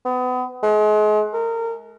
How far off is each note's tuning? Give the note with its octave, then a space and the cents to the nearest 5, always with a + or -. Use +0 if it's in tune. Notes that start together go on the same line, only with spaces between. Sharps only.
B3 +35
G#3 +35
A#4 -25